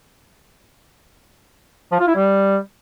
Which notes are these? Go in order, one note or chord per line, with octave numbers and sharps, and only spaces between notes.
F3
F4
E4
G3